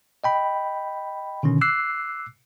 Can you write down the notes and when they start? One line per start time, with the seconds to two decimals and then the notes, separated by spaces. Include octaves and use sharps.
0.24 D#5 G5 B5
1.43 B2 D3 D#3 C#4
1.61 D6 E6 F#6 C7